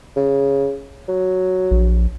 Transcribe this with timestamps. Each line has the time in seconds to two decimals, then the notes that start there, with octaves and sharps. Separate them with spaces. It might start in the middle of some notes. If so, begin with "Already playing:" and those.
0.16 C#3
1.08 F#3
1.71 A#1